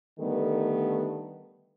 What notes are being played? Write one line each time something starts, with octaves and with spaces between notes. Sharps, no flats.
D3 D#3 G3 A3 B3 A4